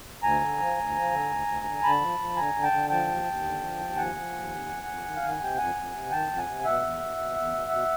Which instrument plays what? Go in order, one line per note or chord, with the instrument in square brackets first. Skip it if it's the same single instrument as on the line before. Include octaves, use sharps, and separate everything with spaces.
[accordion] D2 G#5 A#5
D3
F3
D2
F3
D3
D2
D2
D3
D3 A5 B5
F3
F3
D3 G#5 A#5
D3
G5 A5
D3
F3 G5 A5
D#2
D#2
D3
F3
D#2
F3 F#5 G#5
F3
D#2
F2
F2
F2
D#3
F5
D#3
F#5
C3 G5
F2 F#5 G#5
F2
C3
D#3 G5 A5
F2
F#5 G#5
C3
B2 E5 F#5
E2
B2
B2
E2
B2
B2